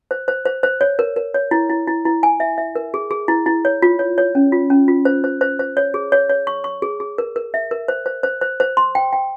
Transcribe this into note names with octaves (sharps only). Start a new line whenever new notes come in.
C5
C5
C5
C5
C#5
A#4
A#4
C#5
E4
E4
E4
E4
G#5
E5
E5
A#4
G#4
G#4
E4
E4
C#5
F4
C#5
C#5
C#4
F4
C#4
F4
C5
C5
C5
C5
C#5
G#4
C#5
C#5
C#6
C#6
G#4
G#4
A#4
A#4
E5
A#4
C5
C5
C5
C5
C5
C6
G5
G5